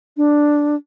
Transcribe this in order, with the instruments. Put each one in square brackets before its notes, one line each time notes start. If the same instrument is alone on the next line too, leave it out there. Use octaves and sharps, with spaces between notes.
[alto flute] D4